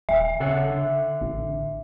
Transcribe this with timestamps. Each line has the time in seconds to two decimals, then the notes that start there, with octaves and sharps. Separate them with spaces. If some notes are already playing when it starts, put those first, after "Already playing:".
0.09 D#1 E5
0.40 C#3 A4 C#5 F#5
0.70 D3
1.21 A1